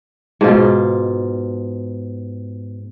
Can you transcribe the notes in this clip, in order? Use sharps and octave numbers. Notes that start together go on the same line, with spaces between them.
G#2 B2 F4